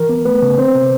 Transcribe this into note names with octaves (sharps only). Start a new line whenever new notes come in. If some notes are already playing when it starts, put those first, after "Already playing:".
Already playing: E3 A#4
B3
A3 B4
C#3
C4 C5
C3